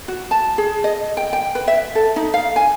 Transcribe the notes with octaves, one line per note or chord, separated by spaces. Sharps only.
F#4
A5
G#4
D#5
G5
G5
B4
E5
A4
D#4
F5
G#5